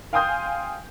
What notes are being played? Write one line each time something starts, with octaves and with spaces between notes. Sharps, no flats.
F5 G5 G#5 C6 D#6 G6